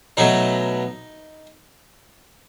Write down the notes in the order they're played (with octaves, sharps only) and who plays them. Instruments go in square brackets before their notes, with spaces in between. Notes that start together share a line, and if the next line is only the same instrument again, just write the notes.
[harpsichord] B2 F#3 A3 D#4